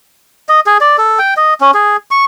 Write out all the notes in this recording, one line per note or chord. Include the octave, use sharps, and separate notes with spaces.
D#5
G#4
D5
A4
G5
D#5
C#4
G#4
C#6